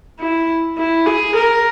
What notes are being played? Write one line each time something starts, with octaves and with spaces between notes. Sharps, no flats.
E4
E4
G#4
A#4